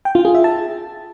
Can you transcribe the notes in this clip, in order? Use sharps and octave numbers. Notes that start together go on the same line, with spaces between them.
G5
F4
G#4
E5
A5